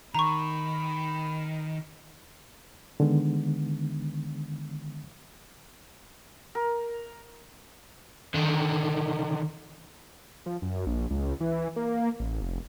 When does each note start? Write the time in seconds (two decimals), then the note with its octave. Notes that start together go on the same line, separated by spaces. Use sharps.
0.15 D#3 A#5 B5 C#6
3.00 D3 D#3 G#3 B3
6.55 A#4
8.34 D3 D#3
10.46 F3
10.62 F#2
10.86 A#1
11.10 C#2
11.40 E3
11.76 A#3
12.20 A1
12.42 F1